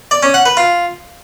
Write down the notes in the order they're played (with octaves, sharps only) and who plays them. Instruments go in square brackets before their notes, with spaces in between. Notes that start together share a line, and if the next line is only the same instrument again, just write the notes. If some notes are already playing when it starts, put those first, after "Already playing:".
[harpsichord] D5
C#4
F#5
B4
F4